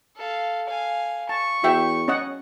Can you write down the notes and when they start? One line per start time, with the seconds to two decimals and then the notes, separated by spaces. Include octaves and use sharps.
0.17 A4 F5
0.68 F5 G#5
1.29 A5 C#6
1.64 E2 F#4 E5 G5
2.08 C#4 D#5 F#5